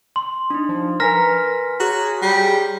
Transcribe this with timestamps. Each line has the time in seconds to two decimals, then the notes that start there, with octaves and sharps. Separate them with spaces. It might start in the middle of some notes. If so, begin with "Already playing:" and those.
0.16 C6
0.50 D4 D#4
0.69 F3
1.00 A#4 B4 G#5 A#5 F6 A#6 B6
1.80 F#4 G#4 C#5 A#5
2.22 G3